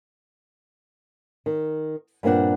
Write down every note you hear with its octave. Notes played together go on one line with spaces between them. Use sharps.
D#3
G2 A#2 A#3 C4 D4 F#5